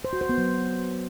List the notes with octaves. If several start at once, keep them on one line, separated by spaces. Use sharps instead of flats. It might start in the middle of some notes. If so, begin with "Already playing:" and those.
C5
F#4
C5
B3
F#3